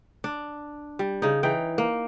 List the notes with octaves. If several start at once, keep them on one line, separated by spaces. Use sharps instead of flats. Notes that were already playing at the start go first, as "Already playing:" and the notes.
D4
G3
C#3 D#4
E3 D#4 G5
A#3